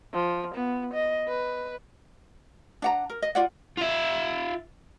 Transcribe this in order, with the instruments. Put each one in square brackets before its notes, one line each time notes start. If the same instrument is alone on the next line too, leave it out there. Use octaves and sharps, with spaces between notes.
[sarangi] F3
B3
D#5
B4
[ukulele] D4 F#5 A#5
A#4
D#5
F4 D5 F#5
[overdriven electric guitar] F4 E5